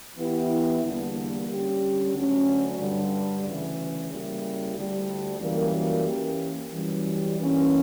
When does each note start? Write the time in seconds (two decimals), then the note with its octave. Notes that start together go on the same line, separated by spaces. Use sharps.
0.16 E3 B3 E4 G4
0.82 E2 D3 G3 A#3
1.48 D3 G3 C#4 G4
2.13 D2 D3 F#3 C#4
2.78 G2 D3 G3
3.44 D2 C#3 E3
4.09 C#3 G3 A#3 E4 G4
4.75 D2 D3 G3
5.41 F#2 E3 G3 A#3
6.05 E3 A#3 C#4 G4
6.71 F#2 E3 G3 C#4
7.36 G2 E3 A#3 C#4